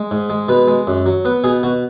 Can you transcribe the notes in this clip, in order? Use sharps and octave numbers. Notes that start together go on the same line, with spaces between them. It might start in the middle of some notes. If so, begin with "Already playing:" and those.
Already playing: G#3
G#2
G#3
B2 B4
G#3
F#2
F#3
B3 B4
B2 G#4
B2 F#4